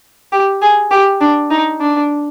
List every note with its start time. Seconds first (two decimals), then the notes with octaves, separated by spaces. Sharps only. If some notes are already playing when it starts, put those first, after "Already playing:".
0.32 G4
0.62 G#4
0.91 G4
1.21 D4
1.51 D#4
1.81 D4